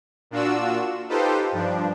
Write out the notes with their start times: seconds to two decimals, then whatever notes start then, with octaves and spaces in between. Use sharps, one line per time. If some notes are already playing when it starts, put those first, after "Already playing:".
0.31 A#2 D4 F4 F#4 E6
1.09 D#4 F4 G4 A4 B4 C5
1.52 G2 F3 D4